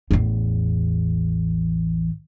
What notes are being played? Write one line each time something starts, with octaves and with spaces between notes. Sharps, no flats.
A1 E2